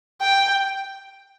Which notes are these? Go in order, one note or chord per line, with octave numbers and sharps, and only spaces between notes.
G5